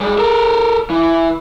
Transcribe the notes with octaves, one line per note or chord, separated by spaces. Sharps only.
G3 G#3
A4 A#4
E3